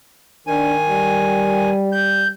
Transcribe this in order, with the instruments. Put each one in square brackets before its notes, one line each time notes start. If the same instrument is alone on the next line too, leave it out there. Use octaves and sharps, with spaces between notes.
[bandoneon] D#3 G#5 [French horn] D4
[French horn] G3
[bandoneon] G6